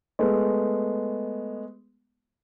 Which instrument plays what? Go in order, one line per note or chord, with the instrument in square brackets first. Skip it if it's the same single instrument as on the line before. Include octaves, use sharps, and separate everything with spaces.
[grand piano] G#3 A3 B3